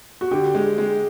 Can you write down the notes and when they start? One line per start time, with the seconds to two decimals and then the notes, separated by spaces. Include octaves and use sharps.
0.21 F#4
0.31 D3 G4
0.55 G#3
0.78 G#3